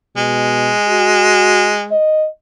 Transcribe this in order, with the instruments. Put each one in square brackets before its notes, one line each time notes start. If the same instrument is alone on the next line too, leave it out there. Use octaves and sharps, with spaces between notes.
[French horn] B2 [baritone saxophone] G#3
[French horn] F#4
D#5